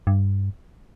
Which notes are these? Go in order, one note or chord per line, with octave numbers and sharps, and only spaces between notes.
G2